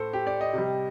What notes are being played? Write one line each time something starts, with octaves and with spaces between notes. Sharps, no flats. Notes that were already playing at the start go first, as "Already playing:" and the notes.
Already playing: A2 A4 C5
G4
D5
D#5
C3 G3